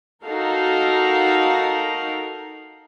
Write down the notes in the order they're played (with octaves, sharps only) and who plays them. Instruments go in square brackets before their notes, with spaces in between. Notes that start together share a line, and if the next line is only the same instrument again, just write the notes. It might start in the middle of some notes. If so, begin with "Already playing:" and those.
[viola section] D#4 F#4 A4 A#4 F5